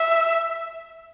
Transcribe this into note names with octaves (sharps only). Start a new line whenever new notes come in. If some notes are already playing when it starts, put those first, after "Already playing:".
Already playing: E5